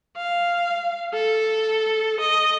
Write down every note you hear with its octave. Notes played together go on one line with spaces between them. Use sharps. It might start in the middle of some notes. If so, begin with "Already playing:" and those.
F5
A4
D#5